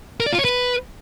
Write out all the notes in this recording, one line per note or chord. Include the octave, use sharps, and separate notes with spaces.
A#4
D5
F4
C#5
B4